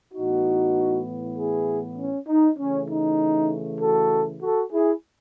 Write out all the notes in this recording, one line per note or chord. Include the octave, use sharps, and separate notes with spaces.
A2 E3 B3 D#4 F#4
E4 G#4
C#4
D#4
C#3 E3 A3 C#4
D#4
F#4 A4
F#4 A4
E4 G#4